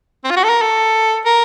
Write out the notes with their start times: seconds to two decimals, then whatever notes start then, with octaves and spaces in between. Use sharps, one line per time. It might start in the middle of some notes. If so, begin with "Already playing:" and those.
0.24 C4
0.30 F4
0.36 F#4
0.44 A4
0.49 A#4
0.62 A4
1.25 A#4